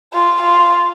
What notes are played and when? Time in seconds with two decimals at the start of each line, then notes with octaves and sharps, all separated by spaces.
0.13 F4
0.42 F4